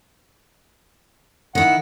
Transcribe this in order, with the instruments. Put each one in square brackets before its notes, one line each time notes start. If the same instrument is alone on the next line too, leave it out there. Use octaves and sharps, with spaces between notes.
[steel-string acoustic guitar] D#3 E4 [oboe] F#5